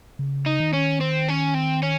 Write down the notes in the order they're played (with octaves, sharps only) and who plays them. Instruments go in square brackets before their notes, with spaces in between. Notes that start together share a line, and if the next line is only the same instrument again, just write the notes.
[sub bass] C#3
[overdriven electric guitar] D#4
[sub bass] D#3
[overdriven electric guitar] C#4
C4
C#4
C4
C#4